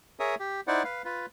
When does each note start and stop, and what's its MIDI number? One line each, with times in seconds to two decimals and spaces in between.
0.20 0.35 68
0.20 0.35 70
0.20 0.35 73
0.20 0.35 76
0.20 0.35 87
0.40 0.61 67
0.67 0.83 63
0.67 0.83 64
0.67 0.83 72
0.67 0.83 74
0.67 0.83 78
0.84 1.02 71
0.84 1.02 77
1.05 1.26 65
1.05 1.26 71